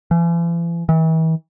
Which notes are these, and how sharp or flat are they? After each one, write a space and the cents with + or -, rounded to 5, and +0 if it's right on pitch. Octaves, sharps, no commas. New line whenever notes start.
E3 +45
E3 -40